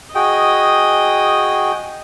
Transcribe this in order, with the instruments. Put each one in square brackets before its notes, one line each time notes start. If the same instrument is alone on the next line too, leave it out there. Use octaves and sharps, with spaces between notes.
[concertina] F#4 G#4 G5 [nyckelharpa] D#5